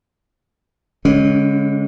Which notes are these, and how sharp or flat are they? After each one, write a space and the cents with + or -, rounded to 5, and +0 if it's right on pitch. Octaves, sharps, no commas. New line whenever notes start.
D3 -35 G#3 +0 C#4 +0